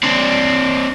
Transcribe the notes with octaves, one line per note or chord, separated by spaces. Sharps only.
C4 D4